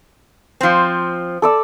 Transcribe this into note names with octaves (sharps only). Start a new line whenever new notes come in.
F3 C4
A4 D5 E6